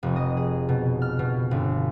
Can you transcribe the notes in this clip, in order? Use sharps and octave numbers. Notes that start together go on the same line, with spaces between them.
F1
D#5
G#4
B2
F6
B2
G1